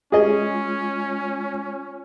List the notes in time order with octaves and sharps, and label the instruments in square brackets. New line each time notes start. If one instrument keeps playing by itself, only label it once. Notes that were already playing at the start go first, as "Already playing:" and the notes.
[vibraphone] G#3 F4 [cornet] C#4 [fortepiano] G#4 D#5